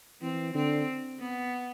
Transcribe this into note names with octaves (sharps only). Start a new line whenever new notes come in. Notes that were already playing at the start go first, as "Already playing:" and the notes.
E3 C4
D3 C4
B3